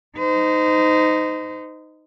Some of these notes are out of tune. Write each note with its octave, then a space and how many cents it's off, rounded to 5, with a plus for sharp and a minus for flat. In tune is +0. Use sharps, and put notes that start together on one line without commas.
D#4 +0 C5 -35